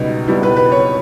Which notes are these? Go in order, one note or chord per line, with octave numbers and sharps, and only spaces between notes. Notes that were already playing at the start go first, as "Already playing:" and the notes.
Already playing: C#2 B2 G3 B3 D#4
C#2 B2 G3 B3 E4
B4
B4
C#5